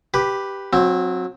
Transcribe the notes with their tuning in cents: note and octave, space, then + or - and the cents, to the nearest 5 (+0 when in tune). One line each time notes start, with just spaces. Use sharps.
G4 +0 B4 +0
F#3 -25 C4 +0